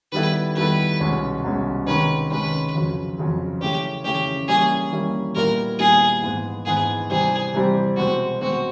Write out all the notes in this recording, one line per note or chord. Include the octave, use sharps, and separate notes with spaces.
D#3 G3 B3 E4 A4 B4
D#3 G3 B3 E4 A4 B4
C2 B2 G#3 C#4
C2 B2 G#3 C#4
C3 D#3 G#3 C#4 B4
C3 D#3 G#3 C#4 B4
F2 C#3 F#3
F2 C#3 F#3
C#3 E3 A3 C#4 G4
C#3 E3 A3 C#4 G4
E3 G3 A#3 C#4 E4 G#4
E3 G3 A#3 C#4 E4
A#2 G3 B3 E4 A#4
A#2 G3 B3 E4 G#4
G#2 E3 G#3 B3
G#2 E3 G#3 B3 G#4
C3 E3 G3 C4 G#4
C3 E3 G3 C4
B2 G#3 C4 F#4
B2 G#3 C4 F#4